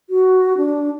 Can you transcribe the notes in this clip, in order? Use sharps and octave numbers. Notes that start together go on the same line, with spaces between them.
F#4
D4